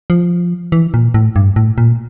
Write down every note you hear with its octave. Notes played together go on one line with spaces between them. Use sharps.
F3
E3
A#2
A2
G2
A2
A#2